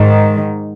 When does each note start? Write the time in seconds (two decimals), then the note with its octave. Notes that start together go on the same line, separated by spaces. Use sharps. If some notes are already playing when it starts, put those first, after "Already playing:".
Already playing: G#2 D#3